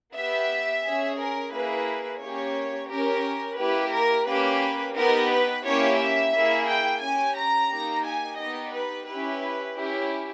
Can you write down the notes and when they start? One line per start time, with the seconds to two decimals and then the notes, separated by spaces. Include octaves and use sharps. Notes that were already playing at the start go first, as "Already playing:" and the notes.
0.15 B3 G4 E5
0.84 C#4 G#4
1.18 A#4
1.53 A#3 E4 G#4 B4
2.21 A#3 C#4 G4 C#5
2.89 C#4 G4 A#4
3.58 A#3 E4 G4 B4
3.92 A#4
4.26 A#3 C#4 G4 B4
4.95 B3 D#4 G4 A#4
5.30 B4
5.64 A#3 C#4 E4 G4 C#5
5.98 E5
6.33 A#3 E4 G#4
6.67 G5
7.01 C#4 G4 G#5
7.36 A#5
7.71 A#3 D#4 G4
8.04 G#5
8.38 B3 D#4 G4 D#5
8.73 B4
9.07 C#4 E4 G4 B4
9.76 C#4 E4 G4